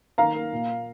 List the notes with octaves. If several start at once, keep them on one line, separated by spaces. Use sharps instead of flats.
D#3 F5 A#5
A#3
A#2
A#3